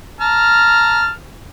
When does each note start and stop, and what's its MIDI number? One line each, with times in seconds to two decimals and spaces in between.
0.21 1.10 81
0.21 1.10 82
0.21 1.10 89